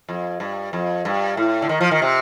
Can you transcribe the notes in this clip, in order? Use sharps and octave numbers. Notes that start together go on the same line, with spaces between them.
F2
G2
F2
G2
A2
D3
D#3
F3
D#3
C3